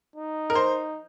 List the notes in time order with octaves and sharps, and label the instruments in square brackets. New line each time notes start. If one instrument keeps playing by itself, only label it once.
[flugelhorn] D#4
[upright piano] A#4
C5